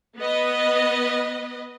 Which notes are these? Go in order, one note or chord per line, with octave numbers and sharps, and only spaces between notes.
B3 B4 D#5